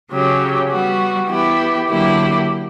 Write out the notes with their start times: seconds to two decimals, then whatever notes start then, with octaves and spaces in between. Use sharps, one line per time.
0.10 C#3 F#3 C#4 G4
0.69 G3 B3 F#4
1.28 E3 B3 E4 G4
1.88 D3 F#3 A#3 E4 G4